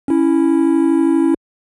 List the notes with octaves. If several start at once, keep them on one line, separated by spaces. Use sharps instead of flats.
C#4 E4